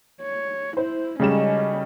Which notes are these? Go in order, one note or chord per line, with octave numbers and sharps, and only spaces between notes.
C#5
E4 C5
C#3 G3 G#3 C#4 D#4 F#4 A4 E7